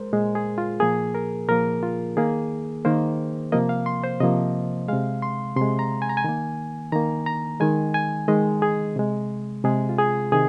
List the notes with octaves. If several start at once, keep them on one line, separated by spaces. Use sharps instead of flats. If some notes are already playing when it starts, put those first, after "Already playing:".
Already playing: G#3 A#4 C5
A#2 G#3
G#4
F4
A#2 F3 A#3 G#4
A#4
A#2 F3 A#3 A#4
F4
D#3 A#3 G#4
D#3 A#3 C5
C3 F3 A#3 D#5
F5
C6
C5
C3 F3 A#3 D#5
C3 G#3 F5
C6
C3 C6
G#3
A#5
G#5
A#5
G#5
D#3 A#3
D#3 A#3 A#5
A#5
D#3 G#3 G#5
G#5
D#3 G#3 D#5
G#4
C3 G#3
C3 G#3 G#4
F4
G#4
C3 D#3 G#4